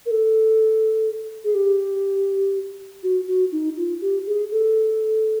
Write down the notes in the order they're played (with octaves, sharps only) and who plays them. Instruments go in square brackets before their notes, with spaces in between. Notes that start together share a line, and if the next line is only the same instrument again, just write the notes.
[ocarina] A#4
A4
G#4
G4
F#4
F#4
D#4
F4
G4
G#4
A4